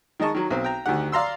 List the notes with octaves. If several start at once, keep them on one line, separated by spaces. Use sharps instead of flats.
D#3 G#3 D#5 A5 C#6
D#3 F#3
B1 C4
G5 A#5
D2 D#3 G4 F#5
D5 F5 A#5 C6 E6